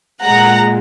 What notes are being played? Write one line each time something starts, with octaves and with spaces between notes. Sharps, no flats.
A#2 G#3 F#5 A#5